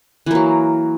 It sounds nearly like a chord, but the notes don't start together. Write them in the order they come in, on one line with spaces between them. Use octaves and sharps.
E3 A#3 F#3